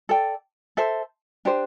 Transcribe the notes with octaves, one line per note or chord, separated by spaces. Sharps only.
A4 D5 G5
A4 C5 E5 A5
D4 G4 C5